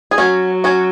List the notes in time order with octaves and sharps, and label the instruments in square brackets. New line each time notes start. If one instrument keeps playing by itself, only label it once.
[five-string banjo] G#4
[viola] F#3 [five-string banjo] C#4 F#4
[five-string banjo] C#4 F#4